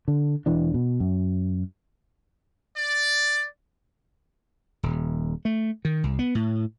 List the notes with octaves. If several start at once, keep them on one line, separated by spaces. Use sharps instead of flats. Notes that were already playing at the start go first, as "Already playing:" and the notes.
D3
E1 E3 D4
B2
F#2
D5
D#1
A3
D#3
C2
B3
A2